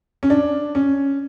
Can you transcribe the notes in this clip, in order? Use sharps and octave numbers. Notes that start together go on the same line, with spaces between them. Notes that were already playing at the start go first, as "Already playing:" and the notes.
C#4
D4
C#4